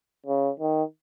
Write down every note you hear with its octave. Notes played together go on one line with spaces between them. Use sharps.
C#3
D#3